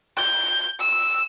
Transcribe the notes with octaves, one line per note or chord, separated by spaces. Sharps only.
G6
E6